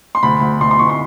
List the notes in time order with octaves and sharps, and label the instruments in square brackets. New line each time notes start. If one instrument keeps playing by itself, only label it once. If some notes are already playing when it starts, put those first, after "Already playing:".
[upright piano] C6
D2 B5
D2
D2 C6
C6
D2 C#6
C6